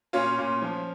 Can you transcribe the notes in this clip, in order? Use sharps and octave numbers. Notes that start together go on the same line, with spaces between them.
A#2 C#4 F4
A#2
F3